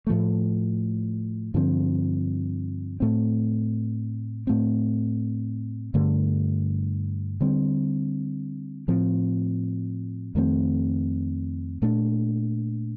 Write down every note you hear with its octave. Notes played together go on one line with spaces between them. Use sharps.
A2 F3 A3
G2 D3 F3 C4
A2 A3 C4
A2 A3 C4
G2 D3 A3
D3 G3 C4
A2 F3 C4
F2 D#3 A3 C4
A#2 A3 D4